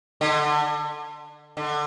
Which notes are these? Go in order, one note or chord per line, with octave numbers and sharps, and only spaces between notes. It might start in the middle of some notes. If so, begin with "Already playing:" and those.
D3
D3